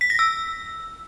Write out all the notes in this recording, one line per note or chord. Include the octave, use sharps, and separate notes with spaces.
B6
A#6
E6